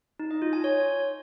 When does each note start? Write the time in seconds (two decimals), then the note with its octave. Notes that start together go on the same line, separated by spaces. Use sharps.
0.19 D#4
0.31 D#5
0.42 F4
0.53 G#5
0.64 C#5